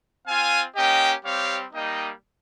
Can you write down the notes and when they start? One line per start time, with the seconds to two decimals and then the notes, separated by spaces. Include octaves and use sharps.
0.27 C4 F4 F5 G#5
0.76 A#3 C#4 G4 D#5 G5
1.25 G3 C4 G4 C#5 F5
1.74 G3 A#3 D#4 D#5 G5